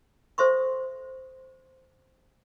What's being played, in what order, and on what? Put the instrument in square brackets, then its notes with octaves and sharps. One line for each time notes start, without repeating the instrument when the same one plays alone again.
[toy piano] A4 C5 E5 C6 C#6